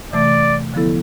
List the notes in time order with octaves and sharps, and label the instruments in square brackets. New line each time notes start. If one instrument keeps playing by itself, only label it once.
[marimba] C3 E3 A3 [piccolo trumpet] D5
[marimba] D3 F3 B3 E4 A4